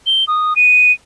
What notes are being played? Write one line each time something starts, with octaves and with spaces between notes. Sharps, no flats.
G7
D#6
D#7